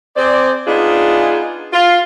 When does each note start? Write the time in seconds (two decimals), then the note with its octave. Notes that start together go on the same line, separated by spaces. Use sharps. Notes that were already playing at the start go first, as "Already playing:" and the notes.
0.16 C4 G#4 C5 D5
0.67 B3 D4 D#4 F4 G#4
1.72 F4